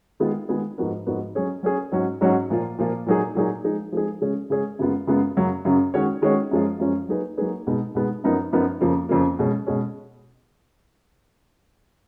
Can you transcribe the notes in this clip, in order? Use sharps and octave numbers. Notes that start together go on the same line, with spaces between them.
D#3 G#3 B3 F4 G#4
D#3 G#3 B3 F4 G#4
G#2 F3 B3 F#4 A#4
G#2 F3 B3 F#4 A#4
F#3 C#4 G#4 C#5
F#3 C#4 G#4 C#5
G#2 F#3 C#4 F#4
G#2 F#3 C#4 F#4
A#2 F3 A#3 F4
A#2 F3 A#3 F4
A#2 F#3 A#3 D#4 G#4
A#2 F#3 A#3 D#4 G#4
F3 G#3 D#4 G#4
F3 G#3 D#4 G#4
C#3 G#3 C#4 G#4
C#3 G#3 C#4 G#4
F#2 C#3 G#3 B3 F4
F#2 C#3 G#3 B3 F4
F#2 C#3 F#3
F#2 C#3 F#3
D#3 G#3 C#4 F#4 C#5
D#3 G#3 C#4 F#4 C#5
F#2 F3 G#3 C#4 F4
F#2 F3 G#3 C#4 F4
F#3 A#3 D#4 G#4 B4
F#3 A#3 D#4 G#4 B4
B2 G#3 B3 D#4
B2 G#3 B3 D#4
F#2 F3 B3 D#4 A#4
F#2 F3 B3 D#4 A#4
F2 C#3 F3 A#3
F2 C#3 F3 A#3
B2 G#3 C#4
B2 G#3 C#4